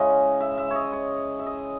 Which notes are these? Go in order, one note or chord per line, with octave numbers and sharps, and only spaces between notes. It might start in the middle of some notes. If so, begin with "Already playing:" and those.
Already playing: C#3 G#3 C#4 E4 D#5
E5
E5
C#5 D#5
C#5
E5
D#5